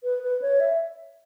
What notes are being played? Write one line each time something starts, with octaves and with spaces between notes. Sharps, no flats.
B4
B4
C#5
E5